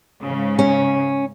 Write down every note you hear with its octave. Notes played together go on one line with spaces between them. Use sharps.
G#2 C#3
C#4